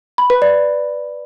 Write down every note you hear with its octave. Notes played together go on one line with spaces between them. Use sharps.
B5
B4
D5